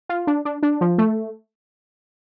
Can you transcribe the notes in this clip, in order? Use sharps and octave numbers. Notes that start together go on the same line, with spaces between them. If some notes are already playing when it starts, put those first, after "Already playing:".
F4
D4
D4
D4
F3
A3